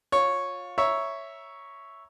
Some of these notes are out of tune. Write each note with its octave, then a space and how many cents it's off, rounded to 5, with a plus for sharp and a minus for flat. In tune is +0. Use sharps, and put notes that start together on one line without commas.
F4 +25 C#5 -5
C#5 +0 E5 +0 A#5 +25